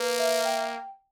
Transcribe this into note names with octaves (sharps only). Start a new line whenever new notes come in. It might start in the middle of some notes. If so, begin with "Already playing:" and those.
Already playing: A#3 B4
E5
G5